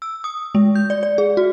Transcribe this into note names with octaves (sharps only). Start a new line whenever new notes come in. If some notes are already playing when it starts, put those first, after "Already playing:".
E6
D#6
G#3
G6
D5
D5
G#4
F#4